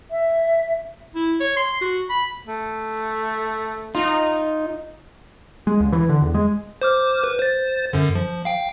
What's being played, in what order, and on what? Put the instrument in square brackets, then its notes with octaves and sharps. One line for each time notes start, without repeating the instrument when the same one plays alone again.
[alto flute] E5
[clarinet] E4
C#5
C6
F#4
B5
[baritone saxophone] A3
[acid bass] D#4 [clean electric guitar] F4
[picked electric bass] G#3
C#2
E3
D3
E2
G#3
[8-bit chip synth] C5 D6 F6
B4
C5 A6
F#2 D3
F3
F5 G5